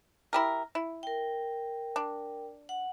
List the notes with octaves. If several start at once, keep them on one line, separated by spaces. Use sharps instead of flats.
E4 G4 A#4
E4
A#4 G5
D4
F#5